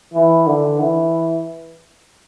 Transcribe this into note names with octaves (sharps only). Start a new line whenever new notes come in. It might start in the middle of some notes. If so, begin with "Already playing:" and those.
E3
D3
E3